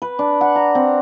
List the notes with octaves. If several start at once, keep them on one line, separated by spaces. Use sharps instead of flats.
B4
D4
F#5
A#5
C4